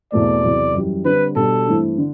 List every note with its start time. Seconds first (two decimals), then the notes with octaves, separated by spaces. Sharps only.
0.12 E2 B2 A3 C4 D5
0.43 E2 C3 F#3
0.74 F#2 E3 G3
1.05 D3 G3 C4 B4
1.36 B2 G3 D4 F#4 A4
1.67 G2 E3 A3 C4 E4
1.98 D3